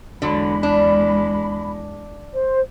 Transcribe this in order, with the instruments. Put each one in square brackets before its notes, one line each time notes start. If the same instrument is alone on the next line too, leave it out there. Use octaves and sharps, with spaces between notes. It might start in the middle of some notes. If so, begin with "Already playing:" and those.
[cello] E2 G#3 [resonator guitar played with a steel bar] D3 F#3 [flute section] B5
[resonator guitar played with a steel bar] D4
[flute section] C5